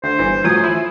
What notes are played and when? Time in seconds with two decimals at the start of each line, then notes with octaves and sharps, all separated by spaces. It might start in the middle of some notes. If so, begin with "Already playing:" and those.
0.04 D2 C5
0.19 G1 E3
0.44 A2 F3 F#3 G#5 D#6
0.64 E4